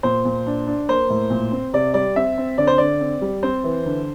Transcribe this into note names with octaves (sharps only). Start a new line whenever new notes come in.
A#2 C5
A#2
D4
D4
A#3 C5
A2
A#2
C4
C3 D5
G3 D5
C4 E5
C4
D3 D5
C5
D3 D5
C4
G3
C4 C5
E3
D3